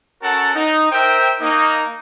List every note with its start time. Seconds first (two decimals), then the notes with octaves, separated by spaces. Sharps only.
0.23 C#4 F#4 A4 A#4 F#5 A5
0.55 D#4
0.91 A#4 C5 E5 G5
1.41 A#3 D#4